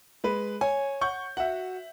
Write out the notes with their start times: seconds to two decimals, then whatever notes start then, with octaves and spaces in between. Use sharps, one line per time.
0.24 G#3 B4
0.61 C#5 G#5
1.01 F#5 C#6 G6
1.37 F#4 E5 F#5